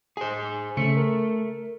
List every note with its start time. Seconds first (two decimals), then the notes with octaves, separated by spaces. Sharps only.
0.17 G#4 C5 G#5
0.77 C#3 A3 C#7
0.97 A#4